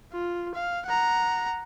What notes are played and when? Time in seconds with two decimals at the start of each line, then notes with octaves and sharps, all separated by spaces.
0.12 F4
0.55 F5
0.86 F#5 A#5